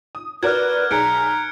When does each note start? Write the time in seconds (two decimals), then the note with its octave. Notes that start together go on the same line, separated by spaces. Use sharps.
0.15 D#6
0.43 F#4 A#4 B4 D5 F6 F#6 G#6
0.91 B1 G#4 A#5 G#6 C#7 D7